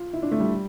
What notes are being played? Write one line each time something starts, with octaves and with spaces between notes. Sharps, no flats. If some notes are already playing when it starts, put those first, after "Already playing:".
Already playing: F4
E4
D4
A3
G3